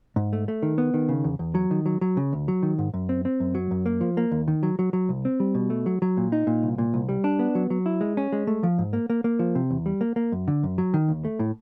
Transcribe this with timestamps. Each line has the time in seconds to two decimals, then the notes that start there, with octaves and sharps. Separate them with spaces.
0.16 G#2
0.33 A3
0.48 A3
0.63 D#3
0.78 B3
0.94 D#3
1.09 C#3
1.24 E2
1.39 E2
1.55 F#3
1.71 D#3
1.86 F#3
2.01 F#3
2.17 C#3
2.33 D2
2.48 F#3
2.63 D#3
2.78 G#2
2.94 F#2
3.09 C4
3.25 C4
3.40 F#2
3.55 F#3
3.71 F#2
3.86 A#3
4.01 F3
4.17 A#3
4.32 D#2
4.48 D#3
4.63 F#3
4.79 F#3
4.93 F#3
5.09 C2
5.25 C4
5.40 G3
5.55 B2
5.70 A3
5.86 F#3
6.02 F#3
6.17 A#2
6.32 D#4
6.47 A#2
6.63 C2
6.78 A#2
6.94 C2
7.09 G3
7.24 D4
7.39 B3
7.55 F#3
7.70 F#3
7.86 E4
8.01 G#3
8.17 C#4
8.33 G#3
8.47 A3
8.63 F3
8.78 G#2
8.93 A#3
9.10 A#3
9.24 A#3
9.39 F3
9.55 C3
9.70 E2
9.86 G3
10.01 A#3
10.16 A#3
10.32 F#2
10.48 D3
10.63 F#2
10.78 F#3
10.94 D#3
11.08 D#2
11.25 A3
11.39 A2